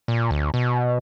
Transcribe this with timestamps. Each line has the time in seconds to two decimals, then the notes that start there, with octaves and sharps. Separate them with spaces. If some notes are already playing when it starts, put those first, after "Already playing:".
0.08 A#2
0.31 D2
0.54 B2